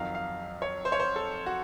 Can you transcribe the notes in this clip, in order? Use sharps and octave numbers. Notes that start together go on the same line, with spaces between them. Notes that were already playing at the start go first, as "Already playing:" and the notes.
Already playing: F2 D#3 F#3 F5
F5
C#5
C5
C#5
C5
A4
F#4